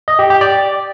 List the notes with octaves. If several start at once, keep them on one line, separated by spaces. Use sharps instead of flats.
D#5
G4
G4
D5